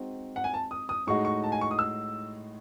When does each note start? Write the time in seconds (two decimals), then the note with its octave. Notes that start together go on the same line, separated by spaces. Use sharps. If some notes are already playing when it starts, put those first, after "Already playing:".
Already playing: G#3 C4 D#4 F#4
0.36 F#5
0.44 G#5
0.54 A5
0.71 D#6
0.89 D#6
1.07 A2 G#3 D#4 F#4 C#6
1.25 C#6
1.44 A5
1.52 G#5
1.61 C#6
1.71 D#6
1.79 E6